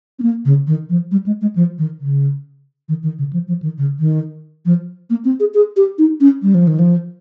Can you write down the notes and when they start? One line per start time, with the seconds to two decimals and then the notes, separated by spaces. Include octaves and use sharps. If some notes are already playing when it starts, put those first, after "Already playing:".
0.19 C4
0.22 A#3
0.45 C#3
0.67 D#3
0.89 F3
1.12 G3
1.26 G#3
1.41 G#3
1.56 F3
1.78 D#3
2.00 C#3
2.89 D#3
3.03 D#3
3.18 C#3
3.33 F3
3.48 F3
3.63 D#3
3.78 C#3
3.99 D#3
4.65 F3
5.10 A#3
5.25 C4
5.40 G#4
5.54 G#4
5.77 G4
5.98 D#4
6.21 C#4
6.42 G3
6.54 F3
6.67 D#3
6.79 F3